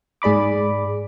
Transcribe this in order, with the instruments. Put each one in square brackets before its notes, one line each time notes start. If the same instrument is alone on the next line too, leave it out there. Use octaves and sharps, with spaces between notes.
[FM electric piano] G#2 G#4 D5 B5 D6